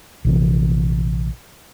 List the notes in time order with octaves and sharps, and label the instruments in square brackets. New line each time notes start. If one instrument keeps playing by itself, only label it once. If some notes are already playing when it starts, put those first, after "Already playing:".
[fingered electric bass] A#1 C3 E3